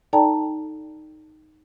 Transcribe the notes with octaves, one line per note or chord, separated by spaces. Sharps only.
D#4 A4 D5 G5 A5 A#5